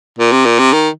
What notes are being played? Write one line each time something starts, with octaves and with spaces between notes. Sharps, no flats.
A#2
C3
A#2
C3
D#3